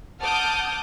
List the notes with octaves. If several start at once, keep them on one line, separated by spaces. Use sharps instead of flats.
F#5 A5 D6 D#6 F6 G6